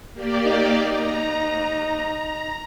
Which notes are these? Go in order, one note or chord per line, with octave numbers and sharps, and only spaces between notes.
A#3 G4 D5
D#4
A#5